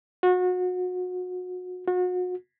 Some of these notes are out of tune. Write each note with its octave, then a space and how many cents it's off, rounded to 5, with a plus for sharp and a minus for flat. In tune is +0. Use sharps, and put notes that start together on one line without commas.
F#4 -30
F#4 -35